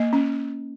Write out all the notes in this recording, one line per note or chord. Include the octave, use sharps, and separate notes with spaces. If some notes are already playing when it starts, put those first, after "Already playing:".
Already playing: A#3 D#5
C#4